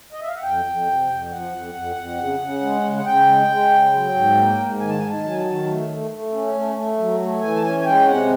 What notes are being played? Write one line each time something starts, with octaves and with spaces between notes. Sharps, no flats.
D#5
E5
F5
F#5
F2 G5
F2
C3
F2
F3 F#5
F2
F2
F2
C#3
C#3
G#3
C#3
F#5
C#3 G5
G#3
G#3
C#3
F#3
G#2
A#3
G#2
D#3 G#5
A5
D#3 G#5
A5
F#3
G#5
A5
D#3
A3
A3
A3
C#4
A3
A3
F#3
A3
E3 G#5
A5
C#4 G#5
G#5
G#3 G5
C3 F#5